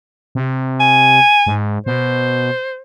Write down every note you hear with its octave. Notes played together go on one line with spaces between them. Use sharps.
C3
G#5
G#2
B2 C5